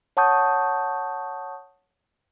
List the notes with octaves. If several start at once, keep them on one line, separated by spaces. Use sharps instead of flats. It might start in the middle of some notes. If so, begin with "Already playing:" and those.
C#5 F#5 A5 C#6 D#6 G6